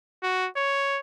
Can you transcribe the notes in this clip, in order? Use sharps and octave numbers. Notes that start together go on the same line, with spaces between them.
F#4
C#5